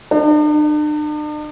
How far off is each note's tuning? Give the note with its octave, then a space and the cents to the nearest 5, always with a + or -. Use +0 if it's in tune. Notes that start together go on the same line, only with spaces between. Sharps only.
D4 +45